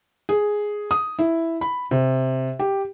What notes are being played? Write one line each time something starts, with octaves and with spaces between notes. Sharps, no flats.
G#4
D#6
E4
B5
C3
G4